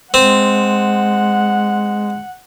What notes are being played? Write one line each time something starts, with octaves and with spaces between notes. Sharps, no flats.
G#3 C4 F#5